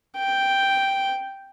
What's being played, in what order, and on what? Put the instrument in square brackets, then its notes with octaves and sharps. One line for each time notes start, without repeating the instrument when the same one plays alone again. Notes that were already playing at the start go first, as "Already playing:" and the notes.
[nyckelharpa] G5